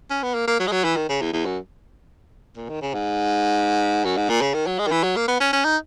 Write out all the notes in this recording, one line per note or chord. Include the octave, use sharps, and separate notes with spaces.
C#4
B3
A#3
A#3
F#3
G#3
F#3
E3
D#3
C#3
E2
E2
F#2
A#2
D#3
C#3
G#2
F#2
G#2
A#2
C#3
D#3
F#3
G#3
D#3
E3
F#3
A#3
B3
C#4
C#4
D#4